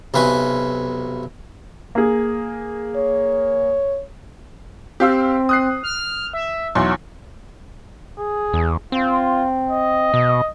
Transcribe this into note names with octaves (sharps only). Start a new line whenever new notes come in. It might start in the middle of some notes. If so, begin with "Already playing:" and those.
B1 C3 B4 G#5 C#6
A#3 G#4
C#5
C4 G4 F5 E6
D#6 F#6 C7
F6
E5
B1 E2 F#3 C6
G#4
E2
C4 F4
D#5
B2